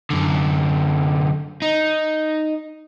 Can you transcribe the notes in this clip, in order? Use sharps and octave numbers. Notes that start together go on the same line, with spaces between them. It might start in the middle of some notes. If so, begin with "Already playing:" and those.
F#2 D3
D#4